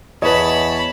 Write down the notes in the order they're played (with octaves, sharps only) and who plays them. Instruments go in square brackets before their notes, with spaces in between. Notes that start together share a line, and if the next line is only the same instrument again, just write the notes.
[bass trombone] E2 [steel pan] B4 D#5 [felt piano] C#5 [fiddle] A5 B5